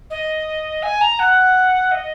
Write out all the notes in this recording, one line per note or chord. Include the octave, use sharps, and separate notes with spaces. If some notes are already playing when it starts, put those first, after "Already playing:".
D#5
G#5
A#5
F#5
D#5